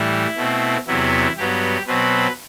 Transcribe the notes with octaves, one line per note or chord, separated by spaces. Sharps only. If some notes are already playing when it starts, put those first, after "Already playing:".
Already playing: A2 E3 G3 E4
B2 A3 C4
E2 C3 F#3 B3 E4
G2 F#3 B3 G4
B2 F#3 C4 B4